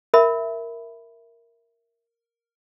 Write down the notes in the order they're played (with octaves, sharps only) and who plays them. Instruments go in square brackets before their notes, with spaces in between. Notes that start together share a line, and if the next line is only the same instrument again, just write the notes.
[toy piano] A#4 E5 B5